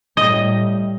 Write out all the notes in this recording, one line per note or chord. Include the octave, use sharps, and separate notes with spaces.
A2 G3 D#5